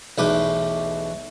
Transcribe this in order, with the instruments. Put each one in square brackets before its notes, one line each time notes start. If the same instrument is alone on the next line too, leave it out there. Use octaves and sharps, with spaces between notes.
[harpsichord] B1 E2 B2 A3 B4 D6